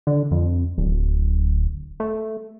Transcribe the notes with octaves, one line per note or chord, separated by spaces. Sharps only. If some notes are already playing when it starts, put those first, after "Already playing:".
D3
F2
D1
A3